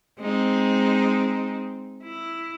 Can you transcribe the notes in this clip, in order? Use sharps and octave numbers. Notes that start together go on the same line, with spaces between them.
G#3 C4 D#4
E4